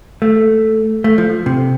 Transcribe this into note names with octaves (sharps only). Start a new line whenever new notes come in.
A3
A3
F3
C3